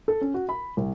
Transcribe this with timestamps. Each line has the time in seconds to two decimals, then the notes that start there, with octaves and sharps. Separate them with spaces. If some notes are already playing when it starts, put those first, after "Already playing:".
0.08 A4
0.21 C#4
0.34 F#4
0.49 B5
0.77 C2